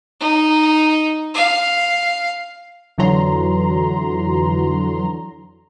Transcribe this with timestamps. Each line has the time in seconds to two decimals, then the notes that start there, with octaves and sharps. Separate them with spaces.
0.20 D#4
1.34 F5
2.98 F2 D3 E3 F#3 A#5 C6